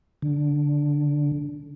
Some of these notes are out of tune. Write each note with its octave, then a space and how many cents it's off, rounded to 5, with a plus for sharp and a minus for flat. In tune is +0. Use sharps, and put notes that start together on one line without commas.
D3 -15 D4 +0